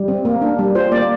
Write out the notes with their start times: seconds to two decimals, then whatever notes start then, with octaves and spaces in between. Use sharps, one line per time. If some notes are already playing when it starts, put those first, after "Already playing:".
Already playing: G3
0.08 C4
0.25 A#3
0.41 D4
0.59 G3
0.75 F4 C5
0.91 A#3 D5